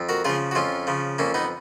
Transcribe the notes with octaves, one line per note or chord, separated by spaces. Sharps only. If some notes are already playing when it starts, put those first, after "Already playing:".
Already playing: F2
F#4 A#4
C#3 F3 F4 G#4
F#4
F2 C#4 F4
C#3 F3
F2 A#3 C#4
B3 D#4